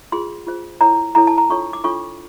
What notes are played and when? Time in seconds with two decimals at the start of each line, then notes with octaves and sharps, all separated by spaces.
0.12 F4 G#4 C5 C6
0.47 F4 G#4 C5
0.81 E4 A4 C#5 A#5
1.15 E4 A4 C#5 A#5
1.27 A5
1.38 A#5
1.50 D4 F4 A4 C#5 C#6
1.73 D6
1.84 D4 F4 A4 C#5 C#6